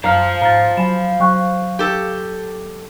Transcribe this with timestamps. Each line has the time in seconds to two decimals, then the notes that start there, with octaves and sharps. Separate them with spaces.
0.04 F#2 C5 F5 A#5 F6 C7
0.42 G#2 A#5 F6 A6
0.77 F#3 G#5 B5 E7
1.20 F#3 G5 C#6 F#6
1.79 G4 A4